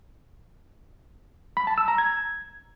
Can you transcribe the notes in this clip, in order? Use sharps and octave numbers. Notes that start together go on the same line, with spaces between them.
B5
A5
E6
A#5
G#6